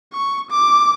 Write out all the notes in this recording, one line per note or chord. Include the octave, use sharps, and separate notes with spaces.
C#6
D6